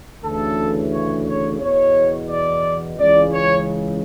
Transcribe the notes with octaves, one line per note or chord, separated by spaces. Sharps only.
D2 C#3 E3 A4
C#5
C#5
E2 B2 C#5
D5
C#2 C#3 E3 D5
C#5